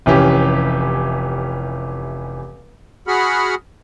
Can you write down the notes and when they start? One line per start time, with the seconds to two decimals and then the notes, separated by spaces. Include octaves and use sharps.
0.06 F1 E3 C#4 G4
3.07 F#4 G#4 F#5 B5 F6